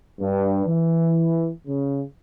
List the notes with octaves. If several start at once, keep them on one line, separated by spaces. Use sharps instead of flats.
G2
E3
C#3